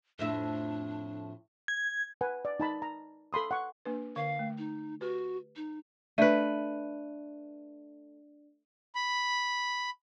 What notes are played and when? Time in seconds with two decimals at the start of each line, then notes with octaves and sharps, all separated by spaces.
0.19 F2 A2 D4 E5
1.68 G#6
2.21 B4 F#5 G#5
2.45 D5
2.60 D#4 A5 B5
2.82 A#5
3.33 A4 B5 C6 D#6
3.51 F#5 C#6
3.85 A#3 D4 B4
4.16 D3 A#4 F5
4.39 A3
4.58 D#4
5.01 F#4 G4 B4
5.56 D#4
6.18 A3 D4 B4 D5 D#7
8.95 B5